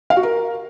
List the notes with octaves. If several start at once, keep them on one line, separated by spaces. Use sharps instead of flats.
F5
F#4
A#4